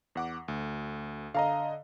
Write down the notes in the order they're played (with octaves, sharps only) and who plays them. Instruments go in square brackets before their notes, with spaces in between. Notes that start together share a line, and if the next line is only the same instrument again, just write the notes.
[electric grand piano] E2 F#5 D6
D2
[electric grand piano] D3 D#5 [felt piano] F5 A#5